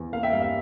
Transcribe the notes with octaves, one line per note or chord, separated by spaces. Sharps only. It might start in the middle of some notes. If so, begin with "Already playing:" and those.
Already playing: E2
A#3 F5
E5 G5
G2 F5
E5